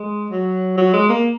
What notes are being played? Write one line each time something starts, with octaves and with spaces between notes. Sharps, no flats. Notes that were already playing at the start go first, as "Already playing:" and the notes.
Already playing: G#3
F#3
F#3
G#3
A#3